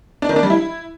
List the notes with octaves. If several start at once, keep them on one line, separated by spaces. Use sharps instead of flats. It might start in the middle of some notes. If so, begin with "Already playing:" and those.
D4
D#3
D4
G3
E4